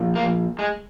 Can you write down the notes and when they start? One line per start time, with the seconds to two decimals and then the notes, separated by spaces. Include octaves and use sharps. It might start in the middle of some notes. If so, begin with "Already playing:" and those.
Already playing: A#2 F3
0.15 A#3
0.59 G#3